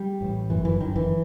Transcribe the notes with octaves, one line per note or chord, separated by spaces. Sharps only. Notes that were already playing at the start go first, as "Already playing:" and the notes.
Already playing: G3
A1 A2
G1 F#2 E3
E3
G1 F#2 D#3
E3